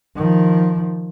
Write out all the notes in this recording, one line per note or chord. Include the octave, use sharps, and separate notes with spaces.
D#3 F3